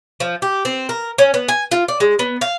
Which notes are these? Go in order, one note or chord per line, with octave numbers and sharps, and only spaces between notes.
F3
G4
C4
A#4
C#4
B3
G#5
F4
D5
G#3
B3
F5